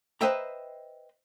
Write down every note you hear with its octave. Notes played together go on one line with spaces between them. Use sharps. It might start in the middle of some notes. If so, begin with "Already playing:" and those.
B4 C5 D#5 E5 G5 A#5